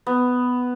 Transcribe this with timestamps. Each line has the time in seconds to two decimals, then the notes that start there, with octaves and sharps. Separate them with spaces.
0.06 B3